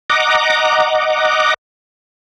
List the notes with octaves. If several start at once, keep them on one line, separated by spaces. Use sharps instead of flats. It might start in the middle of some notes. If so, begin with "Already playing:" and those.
D#5 F#5 A#5 D6